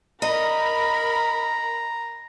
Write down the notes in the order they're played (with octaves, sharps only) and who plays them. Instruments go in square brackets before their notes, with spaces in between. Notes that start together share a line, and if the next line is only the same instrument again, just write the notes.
[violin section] A#4 B5 [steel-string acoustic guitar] D#5 [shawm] A#5